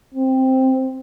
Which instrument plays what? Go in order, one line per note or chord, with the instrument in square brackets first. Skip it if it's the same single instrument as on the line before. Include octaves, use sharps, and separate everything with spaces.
[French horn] C4